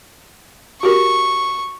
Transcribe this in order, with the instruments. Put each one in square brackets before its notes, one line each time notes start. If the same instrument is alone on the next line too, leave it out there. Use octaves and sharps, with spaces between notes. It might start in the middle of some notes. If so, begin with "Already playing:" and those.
[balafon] F#4 G4 A#4 [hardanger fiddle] C#6